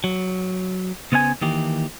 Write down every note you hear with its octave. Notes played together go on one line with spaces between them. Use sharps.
F#3
C#3 B3 C5 F5 G#5
D#3 E3 A#3 G4